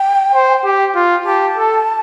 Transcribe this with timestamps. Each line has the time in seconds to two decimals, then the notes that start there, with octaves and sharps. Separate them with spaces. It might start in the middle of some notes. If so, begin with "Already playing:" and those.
Already playing: G5
0.34 C5
0.64 G4
0.95 F4
1.26 G4 A5
1.57 A4